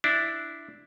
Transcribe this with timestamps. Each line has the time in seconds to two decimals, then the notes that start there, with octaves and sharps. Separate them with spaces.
0.04 D4 E4